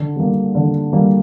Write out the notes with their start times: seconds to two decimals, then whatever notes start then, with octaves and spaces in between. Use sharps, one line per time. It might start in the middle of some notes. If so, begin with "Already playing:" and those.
Already playing: D3
0.16 G3 A#3
0.55 D3
0.93 G3 A#3